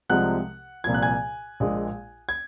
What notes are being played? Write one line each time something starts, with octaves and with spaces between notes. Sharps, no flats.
C2 C3 F3 G#3 F#5 F#6
C2 A#2 F3 G#6
F#6
G#5 G#6
A#1 A#2 G#3
G#6